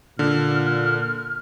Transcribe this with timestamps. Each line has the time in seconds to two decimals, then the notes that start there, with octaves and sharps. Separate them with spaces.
0.19 A#2 D3 F6